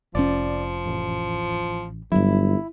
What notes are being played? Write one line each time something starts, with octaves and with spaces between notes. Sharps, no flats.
F1 F3 C#4 D5
A1
G1 G2 F#3 E4